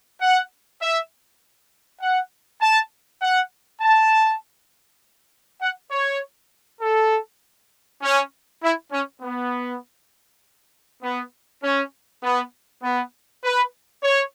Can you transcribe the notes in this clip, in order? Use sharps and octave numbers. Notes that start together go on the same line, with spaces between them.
F#5
E5
F#5
A5
F#5
A5
F#5
C#5
A4
C#4
E4
C#4
B3
B3
C#4
B3
B3
B4
C#5